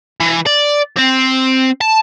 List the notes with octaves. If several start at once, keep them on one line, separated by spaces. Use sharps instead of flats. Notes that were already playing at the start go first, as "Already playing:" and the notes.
E3
D5
C4
A5